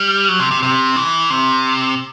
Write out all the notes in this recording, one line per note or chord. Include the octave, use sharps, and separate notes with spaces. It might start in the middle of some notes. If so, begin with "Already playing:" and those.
Already playing: G3
F#3
C3
C3
C3
E3
C3